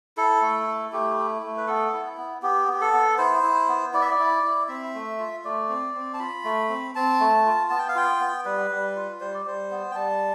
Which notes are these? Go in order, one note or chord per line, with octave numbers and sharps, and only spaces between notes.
E4 A4
A3
E4
A3 G4
E4
A3
B4
B3 A4
E4
B3
B3 G4
B3
G4
A4
B3
E4 C5
E4
B3
E4 D5
E5
D5
E4
E4
C4 E5
A3
F4
A3 D5
C4
C4
A5
F4 B5
A3
C4
C4 A5
A3
F4
B3 A5
G5
F5
F4 G5
B3
G3 B4
G3
F4
G3 C5
D5
G3 C5
B3
G5
G3 A5